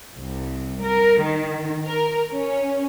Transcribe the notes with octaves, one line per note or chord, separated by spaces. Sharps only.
C2
A#4
D#3
A#4
C#4